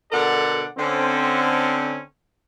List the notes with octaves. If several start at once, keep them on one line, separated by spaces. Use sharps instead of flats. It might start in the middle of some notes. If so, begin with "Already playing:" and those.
B2 D3 A4 A#4 D5 F#5
D3 C4 C#4